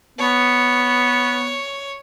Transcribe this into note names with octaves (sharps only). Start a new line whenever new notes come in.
B3 C#5